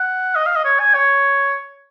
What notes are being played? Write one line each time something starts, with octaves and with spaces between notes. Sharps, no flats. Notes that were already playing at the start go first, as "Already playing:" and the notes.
Already playing: F#5
D#5
F5
D#5
C#5
G#5
C#5